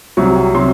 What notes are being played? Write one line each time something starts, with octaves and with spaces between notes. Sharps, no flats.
C2 C3 F#3 C#6
C3 F#3 C6